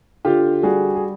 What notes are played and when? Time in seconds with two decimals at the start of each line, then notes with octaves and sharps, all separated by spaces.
0.25 D3 F4 G4
0.63 G3 F#4 G#4
0.95 G#4